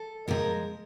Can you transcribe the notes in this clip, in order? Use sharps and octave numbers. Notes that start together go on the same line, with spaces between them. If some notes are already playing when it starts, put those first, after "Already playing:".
Already playing: A4
C3 F3 G#3 A#4